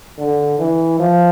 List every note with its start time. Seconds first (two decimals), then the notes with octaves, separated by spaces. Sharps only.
0.18 D3
0.59 E3
0.99 F3